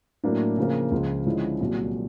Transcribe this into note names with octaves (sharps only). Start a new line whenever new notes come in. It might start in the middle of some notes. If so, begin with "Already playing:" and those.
A2 F#3 A#3 D4
C#3 F3 A#3
C#2 C#3 F3
D3 F3 G#3 C#4 E4
C2 A#2 F#3